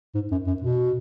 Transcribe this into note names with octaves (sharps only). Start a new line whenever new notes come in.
G#2
F#2
F#2
B2